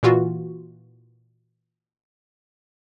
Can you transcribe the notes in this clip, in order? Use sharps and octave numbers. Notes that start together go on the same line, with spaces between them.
A#2 E3 F4 F#4